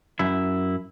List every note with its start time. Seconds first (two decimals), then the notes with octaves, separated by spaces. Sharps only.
0.19 F#2 E4